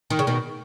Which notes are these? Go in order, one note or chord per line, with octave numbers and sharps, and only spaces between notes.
D#3
C#3
B2 D#3